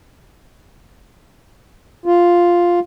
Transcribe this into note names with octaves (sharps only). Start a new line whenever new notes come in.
F4